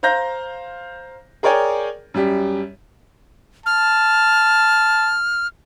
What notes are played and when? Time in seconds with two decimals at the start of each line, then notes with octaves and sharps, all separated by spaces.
0.03 C5 F5 A#5 G6 A#6
1.43 G#4 A#4 C#5 D5 G5 G#5
2.14 F#2 G3 G4
3.66 A5 F6